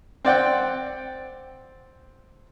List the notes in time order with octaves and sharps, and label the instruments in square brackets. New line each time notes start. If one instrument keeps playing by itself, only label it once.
[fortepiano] C4 D5 F#5 G5